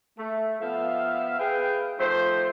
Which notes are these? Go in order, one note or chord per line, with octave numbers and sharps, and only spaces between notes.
A3
F3 B3 E5 F5
G#4 B4 F5 G5
D#3 F3 A3 C5